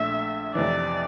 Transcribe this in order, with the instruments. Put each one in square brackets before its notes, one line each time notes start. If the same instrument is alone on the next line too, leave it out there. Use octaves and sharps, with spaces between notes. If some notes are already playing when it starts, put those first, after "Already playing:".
Already playing: [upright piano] A#1 A#2 A3 D4 [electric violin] E5
[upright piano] F2 C3 E3 [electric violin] D5